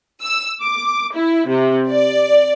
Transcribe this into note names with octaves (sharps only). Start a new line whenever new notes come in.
E6
D6
E4
C3
D5